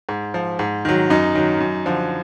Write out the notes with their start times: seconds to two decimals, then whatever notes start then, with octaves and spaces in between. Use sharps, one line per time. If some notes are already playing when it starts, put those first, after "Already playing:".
0.09 G#2
0.34 F3
0.59 G#2
0.85 D#3 F#3
1.10 F#2 D#4
1.35 D#3 F#3
1.60 F#2
1.86 D3 F3